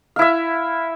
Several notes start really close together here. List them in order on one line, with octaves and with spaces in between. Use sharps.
F5 E4 E5